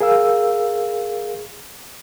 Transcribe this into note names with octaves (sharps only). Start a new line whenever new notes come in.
G#4 A#4 F5 E6